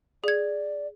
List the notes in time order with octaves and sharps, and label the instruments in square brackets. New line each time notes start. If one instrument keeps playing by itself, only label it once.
[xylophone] G#4 G#6 [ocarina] D5